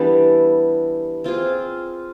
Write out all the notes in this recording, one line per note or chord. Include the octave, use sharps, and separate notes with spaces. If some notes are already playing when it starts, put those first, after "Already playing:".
Already playing: E3 G3 B3 D4
C4 F4 G#4